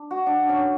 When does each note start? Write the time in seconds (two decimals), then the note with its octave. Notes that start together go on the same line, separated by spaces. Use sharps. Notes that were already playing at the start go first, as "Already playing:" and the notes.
Already playing: D4
0.11 F#4
0.26 D4
0.49 C#4